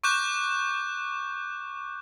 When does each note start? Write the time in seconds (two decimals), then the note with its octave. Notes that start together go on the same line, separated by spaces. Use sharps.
0.04 C#6 D6 F#6 G6 E7